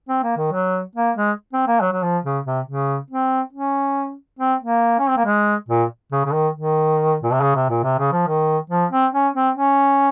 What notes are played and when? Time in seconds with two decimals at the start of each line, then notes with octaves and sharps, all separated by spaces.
0.09 C4
0.23 A#3
0.37 D#3
0.52 F#3
0.96 A#3
1.16 G#3
1.53 C4
1.67 A#3
1.81 F#3
1.92 F#3
2.03 F3
2.24 C#3
2.45 C3
2.67 C#3
3.10 C4
3.53 C#4
4.39 C4
4.61 A#3
4.99 C#4
5.08 C4
5.17 A#3
5.25 G#3
5.68 A#2
6.12 C#3
6.25 C#3
6.33 D#3
6.55 D#3
7.23 A#2
7.32 C3
7.41 C#3
7.55 C3
7.69 A#2
7.83 C3
7.98 C#3
8.12 F3
8.27 D#3
8.70 F3
8.91 C4
9.13 C#4
9.35 C4
9.56 C#4